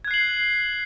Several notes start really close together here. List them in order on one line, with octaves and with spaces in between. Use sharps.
G#6 F#6 C7 F#7